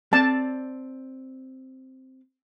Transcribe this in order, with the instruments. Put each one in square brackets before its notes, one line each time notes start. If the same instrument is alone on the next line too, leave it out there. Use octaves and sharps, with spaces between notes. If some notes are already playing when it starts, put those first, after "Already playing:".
[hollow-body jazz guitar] C4 D5 [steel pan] A5